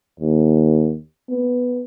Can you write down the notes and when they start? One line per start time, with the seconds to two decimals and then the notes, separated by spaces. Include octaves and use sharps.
0.20 D#2
1.30 B3